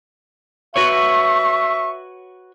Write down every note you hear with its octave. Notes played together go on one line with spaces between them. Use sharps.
F#4 B4 C#5 E5 C#6